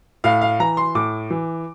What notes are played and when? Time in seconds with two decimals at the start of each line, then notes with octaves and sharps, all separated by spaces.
0.24 A2 F5
0.42 F5
0.60 E3 A#5
0.77 C6
0.95 A2 D6
1.30 E3